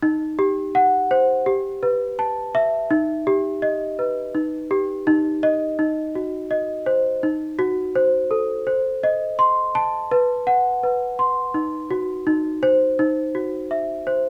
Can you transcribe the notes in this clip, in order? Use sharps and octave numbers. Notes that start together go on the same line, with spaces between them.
D#4
G4
F#5
C5
G4
B4
A5
E5
D#4
G4
D#5
B4
D#4
G4
D#4
D#5
D#4
F#4
D#5
C5
D#4
F#4
C5
A4
C5
D#5
C6
A5
B4
F#5
B4
C6
D#4
F#4
D#4
C5
D#4
F#4
E5
C5